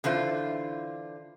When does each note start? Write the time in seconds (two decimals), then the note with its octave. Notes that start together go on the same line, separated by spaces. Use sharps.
0.04 D3 E3 F4 C5